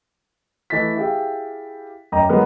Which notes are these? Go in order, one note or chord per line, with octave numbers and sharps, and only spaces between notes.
E3 A3 D#5 A6 B6
E4 G4 G#4 E5 F5 G5
F#2 D#5 G5 A#5 D6
D3 F#3 G#3 B3 G#4 A#4